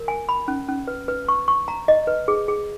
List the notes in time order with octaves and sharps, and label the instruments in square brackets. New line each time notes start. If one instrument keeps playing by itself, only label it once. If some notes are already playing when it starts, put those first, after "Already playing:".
Already playing: [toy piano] A#4
G#5
B5
C#4
C#4
B4
B4
C#6
C#6
A#5
D#5
B4
G#4
G#4